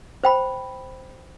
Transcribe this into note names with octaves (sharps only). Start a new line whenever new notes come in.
C5 G5 B5